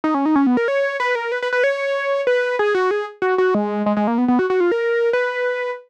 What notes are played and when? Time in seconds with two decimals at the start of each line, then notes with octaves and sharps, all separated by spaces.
0.04 D#4
0.14 C#4
0.26 D#4
0.36 C#4
0.47 B3
0.57 A#4
0.68 C#5
1.00 B4
1.15 A#4
1.32 B4
1.42 B4
1.53 B4
1.64 C#5
2.27 B4
2.59 G#4
2.75 F#4
2.91 G#4
3.22 F#4
3.38 F#4
3.54 G#3
3.86 G#3
3.97 G#3
4.07 A#3
4.18 B3
4.28 B3
4.39 F#4
4.50 F#4
4.60 F4
4.72 A#4
5.13 B4